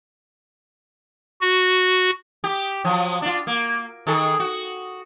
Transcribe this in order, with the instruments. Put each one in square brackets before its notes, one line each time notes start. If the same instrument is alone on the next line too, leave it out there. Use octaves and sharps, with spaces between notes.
[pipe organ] F#4
[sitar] G4
F3 F#3
D4 F4
A#3
D#3 G#4 A4
F#4